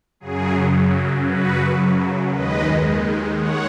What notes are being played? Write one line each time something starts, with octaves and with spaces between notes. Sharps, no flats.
F#2 C#3 F#3 G#4
F#4 B4
D#2 D#3 G#3 B4 D#5
C#5 F#5